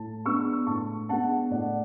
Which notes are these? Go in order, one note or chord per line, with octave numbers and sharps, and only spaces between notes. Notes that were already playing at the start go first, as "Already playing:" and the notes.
Already playing: A2 A5
G#3 B3 D4 C#6 E6
A2 A5 C#6
G#3 B3 D4 F#5 A5
A2 D5 F#5